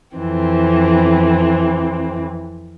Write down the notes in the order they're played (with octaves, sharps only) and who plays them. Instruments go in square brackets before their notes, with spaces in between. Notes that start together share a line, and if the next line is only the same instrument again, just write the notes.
[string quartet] F2 E3 C4